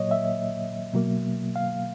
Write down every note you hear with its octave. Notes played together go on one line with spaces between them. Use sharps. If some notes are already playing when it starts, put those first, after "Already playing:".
Already playing: A#2 F#3 A#3 C#5 D#5
E5
B2 F#3 A#3
F5